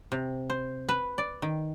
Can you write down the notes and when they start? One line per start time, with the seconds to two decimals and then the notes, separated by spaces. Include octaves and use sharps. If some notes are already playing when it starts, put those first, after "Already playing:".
0.12 C3
0.50 C5
0.89 B4
1.18 D5
1.42 D#3